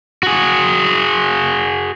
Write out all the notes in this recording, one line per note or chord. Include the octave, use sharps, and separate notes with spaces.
F#4 G#4